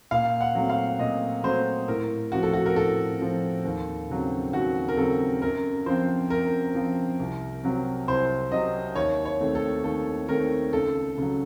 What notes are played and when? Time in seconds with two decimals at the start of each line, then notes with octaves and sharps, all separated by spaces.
0.11 A#2 F5
0.41 F#5
0.55 F#3 A3 C4
0.70 F5
0.99 A#2 D#5
1.44 F#3 A3 C4 C5
1.88 A2 A#4
2.32 F3 C4 F#4
2.43 A4
2.54 F#4
2.66 A#4
2.76 A2 A4
3.21 F3 C4
3.65 D#2
4.10 C#3 F#3 C4
4.53 D#2 F#4
4.88 A#4
4.97 C#3 F#3 C4 A4
5.42 F#2 A#4
5.86 F3 C4 C5
6.30 F#2 A#4
6.75 F3 C4
7.20 C2
7.63 C3 F#3 C4
8.07 C2 C5
8.52 C3 F#3 C4 D#5
8.95 D#2 C#5
9.25 C#5
9.40 D#3 A3 C4
9.55 A4
9.84 D#2 A4
10.28 D#3 A3 C4 A#4
10.73 C#2 A4
11.17 C#3 F#3